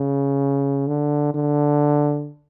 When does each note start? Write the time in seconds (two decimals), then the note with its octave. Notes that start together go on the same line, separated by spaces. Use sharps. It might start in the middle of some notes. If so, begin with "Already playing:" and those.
Already playing: C#3
0.88 D3
1.34 D3